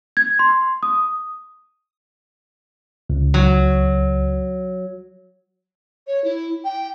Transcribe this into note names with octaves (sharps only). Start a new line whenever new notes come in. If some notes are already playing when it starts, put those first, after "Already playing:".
G#6
C6
D#6
C#2
F#3
C#5
E4
G5